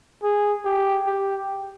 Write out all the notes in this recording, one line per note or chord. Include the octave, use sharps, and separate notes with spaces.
G#4
G4
G4